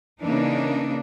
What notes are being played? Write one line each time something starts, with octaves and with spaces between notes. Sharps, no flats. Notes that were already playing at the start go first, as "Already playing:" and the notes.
C#3 E3 A#3 D4 D#4